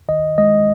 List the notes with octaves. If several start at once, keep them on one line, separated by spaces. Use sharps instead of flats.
D#3 D#5
G#3 D#5